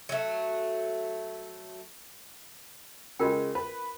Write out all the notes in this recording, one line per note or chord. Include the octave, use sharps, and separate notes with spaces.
F#3 A3
C#3 G#3 F4 A#4 G5
B4